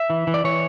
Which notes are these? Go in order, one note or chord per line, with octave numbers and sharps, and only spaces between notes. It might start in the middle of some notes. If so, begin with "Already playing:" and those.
Already playing: E5
E3
E3
D5
E3 C#5